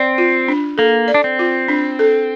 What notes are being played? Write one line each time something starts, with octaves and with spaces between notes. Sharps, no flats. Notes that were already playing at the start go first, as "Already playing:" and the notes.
Already playing: C4 D5
F4
D4
A#3 A4
D5
D4
C4
F4
D4
A4